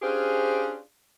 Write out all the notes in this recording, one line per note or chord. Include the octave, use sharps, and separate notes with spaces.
C#4 D4 F4 G4 G#4 C5